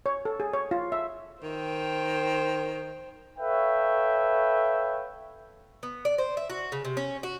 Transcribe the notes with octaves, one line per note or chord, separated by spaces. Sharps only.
C#5
A4
G#4
C#5
F4
E5
D#3 C5 G5
A4 B4 C#5 E5 F5 G5
B3
D5
C5
E5
F#4
C#3
C3
C#4
F#4